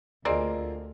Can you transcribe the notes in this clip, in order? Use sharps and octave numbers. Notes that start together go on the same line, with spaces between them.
D2 A#3 C4 F4 G#4 A#4 D5 D#5